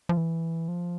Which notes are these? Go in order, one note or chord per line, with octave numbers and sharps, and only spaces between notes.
F3
E3
F3